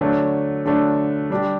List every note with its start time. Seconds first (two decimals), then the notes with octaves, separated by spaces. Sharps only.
0.01 D3 F#3 A3 D4
0.66 D3 F#3 A3 D4
1.30 G3 D4 G4